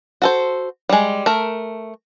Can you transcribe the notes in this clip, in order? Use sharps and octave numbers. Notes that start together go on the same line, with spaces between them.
F#4 A4 C5
G3 G#3
A3 A#4